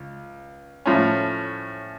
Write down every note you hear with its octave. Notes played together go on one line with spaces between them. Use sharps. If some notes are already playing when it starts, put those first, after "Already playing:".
Already playing: C#2
A2 F3 C#4